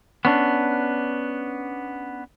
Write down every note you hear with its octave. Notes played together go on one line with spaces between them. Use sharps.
B3 C#4 D4